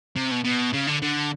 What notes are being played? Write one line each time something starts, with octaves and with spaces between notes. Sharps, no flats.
C3
B2
B2
C#3
D3
D3